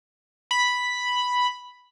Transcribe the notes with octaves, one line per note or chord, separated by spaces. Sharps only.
B5